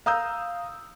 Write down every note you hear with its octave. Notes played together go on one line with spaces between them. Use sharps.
F5 A#5 D#6 E6 G6